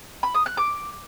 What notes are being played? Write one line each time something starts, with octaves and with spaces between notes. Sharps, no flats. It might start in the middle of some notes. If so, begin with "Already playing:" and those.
B5
D#6
F#6
D6